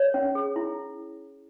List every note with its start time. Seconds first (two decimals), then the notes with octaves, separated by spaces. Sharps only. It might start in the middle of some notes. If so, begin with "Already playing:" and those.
Already playing: C#5
0.14 C#4
0.35 G#4
0.56 E4